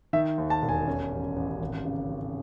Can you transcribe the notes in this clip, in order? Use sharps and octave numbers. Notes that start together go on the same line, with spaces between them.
D#3 E5
D#2
A5
E1
G#5
C#4
A1
A1
G#1
C#3
G#1